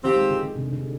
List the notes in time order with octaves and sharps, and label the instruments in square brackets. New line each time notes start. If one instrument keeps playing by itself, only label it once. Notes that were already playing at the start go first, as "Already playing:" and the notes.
[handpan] D#3 [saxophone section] F3 C4 G4
[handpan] G#3
D3
D3
C3
D3